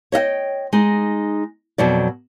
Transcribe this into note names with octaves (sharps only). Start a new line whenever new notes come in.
C#5 D#5 E5 G5
G#3 D#4
F2 B2 F#3 D5